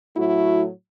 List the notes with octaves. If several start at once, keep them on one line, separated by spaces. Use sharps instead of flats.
A2 F#3 A3 E4 F#4